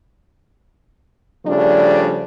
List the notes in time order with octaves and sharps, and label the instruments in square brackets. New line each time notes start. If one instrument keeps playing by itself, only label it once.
[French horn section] C#3 F3 G3 A3 D4